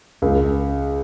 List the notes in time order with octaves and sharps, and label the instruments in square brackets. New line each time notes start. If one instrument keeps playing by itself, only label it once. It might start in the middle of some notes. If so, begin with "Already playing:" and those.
[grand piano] C#2